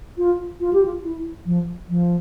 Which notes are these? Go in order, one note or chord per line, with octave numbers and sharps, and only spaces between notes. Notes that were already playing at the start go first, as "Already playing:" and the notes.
F4
F4
G4
F4
E4
F3
F3